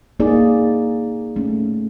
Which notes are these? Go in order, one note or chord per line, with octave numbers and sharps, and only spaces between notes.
A#3 D#4 G#4 D5
A3 C#4